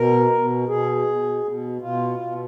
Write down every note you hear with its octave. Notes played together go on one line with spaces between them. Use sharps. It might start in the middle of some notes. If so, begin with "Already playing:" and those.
Already playing: B2 A#4
B2
B2 G#4
B2
B2
B2 F4
B2